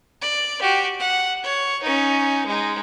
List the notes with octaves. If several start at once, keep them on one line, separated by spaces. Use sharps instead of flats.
D5
F#4 G4
F#5
C#5
C#4 D#4
G#3 D#4